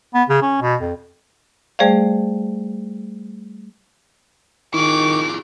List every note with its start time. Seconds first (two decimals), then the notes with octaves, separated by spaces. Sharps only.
0.14 B3
0.29 C#3
0.42 C#4
0.62 B2
0.81 F2
1.79 G3 A3 G#4 C5 D5 F5
4.74 D#3 E4 F4 G#4 C#6 D6